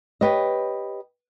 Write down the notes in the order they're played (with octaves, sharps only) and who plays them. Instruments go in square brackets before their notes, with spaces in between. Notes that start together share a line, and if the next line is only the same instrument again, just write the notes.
[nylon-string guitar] G4 B4 C#5 D#5